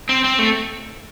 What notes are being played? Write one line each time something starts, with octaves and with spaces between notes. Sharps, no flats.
C4
C4
A3